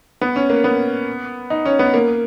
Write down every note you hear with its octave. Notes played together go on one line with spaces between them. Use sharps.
B3
C#4
A#3
B3
D#4
C#4
B3
A#3